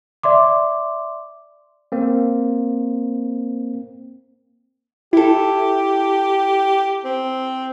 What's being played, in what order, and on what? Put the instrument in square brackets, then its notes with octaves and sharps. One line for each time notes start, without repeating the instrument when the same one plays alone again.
[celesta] D5 E5 C6 D6
[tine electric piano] A#3 C4
[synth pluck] E4 A4 [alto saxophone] G4
[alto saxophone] C4